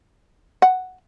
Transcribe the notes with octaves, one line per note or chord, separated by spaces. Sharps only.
F#5